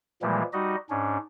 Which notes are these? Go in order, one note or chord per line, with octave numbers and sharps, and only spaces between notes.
A#2 E3 F3 G3 G#3 A#3
G3 D#4 F#4 D#5
G#2 C#4 D4